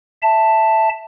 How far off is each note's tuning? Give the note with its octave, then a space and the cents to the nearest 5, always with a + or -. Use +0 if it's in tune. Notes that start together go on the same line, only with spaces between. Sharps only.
E5 +0 A5 +5